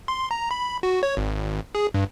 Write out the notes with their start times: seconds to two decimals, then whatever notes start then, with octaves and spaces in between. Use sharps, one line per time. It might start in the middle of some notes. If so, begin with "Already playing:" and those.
0.08 C6
0.31 A#5
0.51 B5
0.83 F#4
1.03 C#5
1.17 G#1
1.75 G#4
1.94 G2